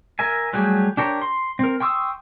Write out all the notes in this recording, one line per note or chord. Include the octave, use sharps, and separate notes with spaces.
A#4 E5 G#5
F#3 G3 A3 G4 G#4
D4 G4 A#4 C#5
C6
C4 A#4
G5 C6 C#6 D#6 E6